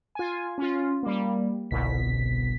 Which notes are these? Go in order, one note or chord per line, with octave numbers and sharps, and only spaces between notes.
F4 G#5
C#4 F4
G3 A#3
G1 C2 B2 B6